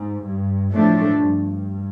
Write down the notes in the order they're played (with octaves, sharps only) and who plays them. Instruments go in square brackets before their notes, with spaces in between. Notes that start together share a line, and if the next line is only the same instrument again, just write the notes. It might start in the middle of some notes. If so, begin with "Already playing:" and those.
Already playing: [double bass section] G#2
G2
[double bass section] A2 [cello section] F3 A3 D4
[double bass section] G2